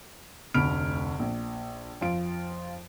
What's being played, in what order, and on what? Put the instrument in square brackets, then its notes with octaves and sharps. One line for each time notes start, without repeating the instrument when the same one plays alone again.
[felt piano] F1 D2 B5 F6 D7
A#1
F2 F4 D7